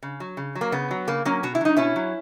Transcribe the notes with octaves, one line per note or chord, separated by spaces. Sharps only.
C#3
F#3
C#3
F#3
A#3
C#3 B3
F#3
C#3 A#3
F#3 A#3 C#4
B2 F#4
E4
F#3 D#4
B2 C#4 E4
F#3